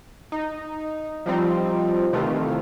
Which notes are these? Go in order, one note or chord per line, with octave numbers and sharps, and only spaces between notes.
D#4
F3 G3 C4 D#4
C3 D#3 E3 A3 F4